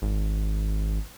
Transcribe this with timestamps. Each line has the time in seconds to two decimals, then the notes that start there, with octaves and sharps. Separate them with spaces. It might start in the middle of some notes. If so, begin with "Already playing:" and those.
0.02 G#1